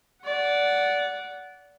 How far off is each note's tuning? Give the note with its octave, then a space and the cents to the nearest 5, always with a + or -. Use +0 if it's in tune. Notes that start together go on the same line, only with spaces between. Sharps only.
D5 -20 F#5 +0